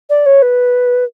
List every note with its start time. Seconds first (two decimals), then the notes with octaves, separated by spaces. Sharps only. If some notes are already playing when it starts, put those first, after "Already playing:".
0.10 D5
0.26 C#5
0.42 B4